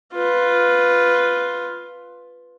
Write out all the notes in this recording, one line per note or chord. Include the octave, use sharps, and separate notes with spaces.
F4 B4